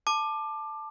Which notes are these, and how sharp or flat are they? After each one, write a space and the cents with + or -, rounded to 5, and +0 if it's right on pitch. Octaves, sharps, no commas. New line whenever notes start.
A5 +0 D6 +20